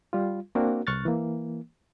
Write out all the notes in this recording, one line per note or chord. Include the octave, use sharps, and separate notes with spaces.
G3 F4
A#3 C4 D4 F#4 A#4
C2 C#6 F6 F#6 A6
E3 A#3